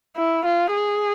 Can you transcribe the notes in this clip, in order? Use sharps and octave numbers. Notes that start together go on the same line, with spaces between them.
E4
F4
G#4